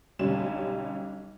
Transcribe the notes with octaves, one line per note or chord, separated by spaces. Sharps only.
B1 D3 G3 C#4 E7